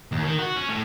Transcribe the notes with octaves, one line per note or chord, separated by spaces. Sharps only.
D#2
D#3
F#4
C#4
A2